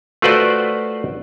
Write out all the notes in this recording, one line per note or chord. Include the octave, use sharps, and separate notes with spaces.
A3 F4 F#4 B4 C5 D5